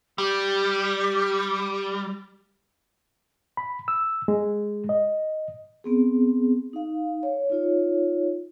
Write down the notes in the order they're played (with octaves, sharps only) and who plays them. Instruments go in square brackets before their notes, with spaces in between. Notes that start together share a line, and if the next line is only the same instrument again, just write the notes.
[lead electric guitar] G3 [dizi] G4
[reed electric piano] B5
E6
G#3
D#5
[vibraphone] B3 C4 G#4
D#4 F5
C#5
D#4 F4 C#5